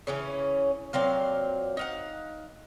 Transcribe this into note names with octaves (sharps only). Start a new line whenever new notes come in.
C#3 E3 C#4
A#2 F#3 C4 F5
D#4 F5 F#5